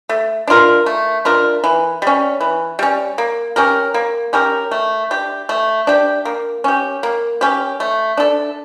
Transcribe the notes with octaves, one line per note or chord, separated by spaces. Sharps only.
A3
D4 F4 A#4
A3
D4 F4 A#4
E3
G3 C#4
E3
G3 C#4
A#3
C#4 G4 A#4
A#3
C#4 G4 A#4
A3
D4 G4
A3
D4 G4
A#3
C#4 G4
A#3
C#4 G4
A3
D4 A4